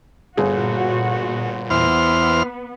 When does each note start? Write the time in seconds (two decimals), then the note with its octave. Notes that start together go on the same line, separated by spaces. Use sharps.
0.37 G1 A#2 F#4 G#4
1.70 E2 B3 C5 F6